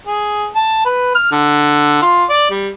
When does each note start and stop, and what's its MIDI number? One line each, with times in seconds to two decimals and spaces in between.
0.07 0.46 68
0.55 0.85 81
0.85 1.12 71
1.15 1.29 89
1.31 2.01 50
2.02 2.24 65
2.30 2.46 74
2.50 2.69 55